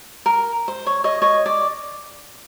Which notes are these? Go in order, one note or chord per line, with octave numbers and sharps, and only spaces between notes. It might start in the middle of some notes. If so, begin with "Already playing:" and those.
A#4
C5
C#5
C#5 D#5
C#5 D#5
D5